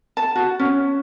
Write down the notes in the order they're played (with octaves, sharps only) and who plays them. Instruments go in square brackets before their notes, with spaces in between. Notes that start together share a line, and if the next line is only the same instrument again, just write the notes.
[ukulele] A5
F#4
C#4